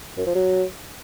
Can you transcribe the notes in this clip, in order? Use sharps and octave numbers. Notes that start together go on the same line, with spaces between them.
F#2
F3
F#3